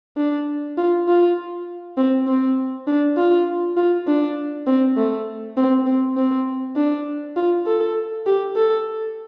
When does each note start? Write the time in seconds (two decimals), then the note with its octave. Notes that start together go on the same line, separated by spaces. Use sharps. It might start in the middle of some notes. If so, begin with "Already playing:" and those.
0.17 D4
0.77 F4
1.08 F4
1.97 C4
2.27 C4
2.87 D4
3.17 F4
3.77 F4
4.07 D4
4.67 C4
4.97 A3
5.57 C4
5.86 C4
6.17 C4
6.76 D4
7.36 F4
7.66 A4
8.26 G4
8.56 A4